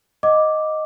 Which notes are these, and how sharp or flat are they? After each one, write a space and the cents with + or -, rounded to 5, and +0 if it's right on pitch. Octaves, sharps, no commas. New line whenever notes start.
D#5 +0 F#5 -35 D6 +0